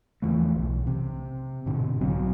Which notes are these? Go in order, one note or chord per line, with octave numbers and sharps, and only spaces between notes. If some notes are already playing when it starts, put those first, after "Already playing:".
E2 E3 F3 A3
B1
C3
G#2 B2 D3
B1 F#3 C4